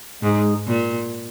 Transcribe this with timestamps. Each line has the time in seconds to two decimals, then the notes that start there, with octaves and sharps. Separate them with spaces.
0.22 G#2 G#3 D#4 G#4
0.67 A#2